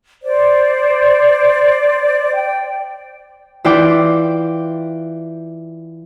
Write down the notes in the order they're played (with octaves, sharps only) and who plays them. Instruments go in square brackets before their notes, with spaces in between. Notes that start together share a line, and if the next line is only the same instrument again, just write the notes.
[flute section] C5 D5
G5
[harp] E3 E4 F4 D5 G5 D6